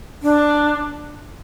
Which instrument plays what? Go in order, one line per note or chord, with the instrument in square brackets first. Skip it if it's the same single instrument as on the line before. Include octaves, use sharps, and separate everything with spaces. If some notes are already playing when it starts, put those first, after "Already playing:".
[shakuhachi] D4